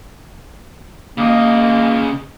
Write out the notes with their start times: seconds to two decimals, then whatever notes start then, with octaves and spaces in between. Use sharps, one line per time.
1.18 C#3 A#3 D#5